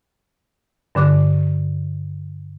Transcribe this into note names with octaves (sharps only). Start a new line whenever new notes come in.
G2 D3 D6 F#6